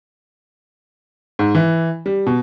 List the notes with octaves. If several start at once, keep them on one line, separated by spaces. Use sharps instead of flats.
G#2
E3
G3
B2